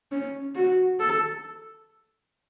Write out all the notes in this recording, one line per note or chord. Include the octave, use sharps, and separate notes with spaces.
C#4
F#4
A4